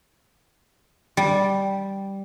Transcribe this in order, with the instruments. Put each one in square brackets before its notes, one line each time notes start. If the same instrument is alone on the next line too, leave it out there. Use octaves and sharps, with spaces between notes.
[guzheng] G3